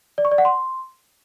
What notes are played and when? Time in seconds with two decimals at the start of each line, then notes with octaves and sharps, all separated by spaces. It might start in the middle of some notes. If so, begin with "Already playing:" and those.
0.18 D5
0.25 C#6
0.31 D5
0.38 F#5
0.45 C6